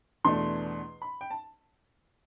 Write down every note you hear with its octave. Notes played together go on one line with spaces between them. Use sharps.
E2 B2 A3 D4 C6
B5
G5
A5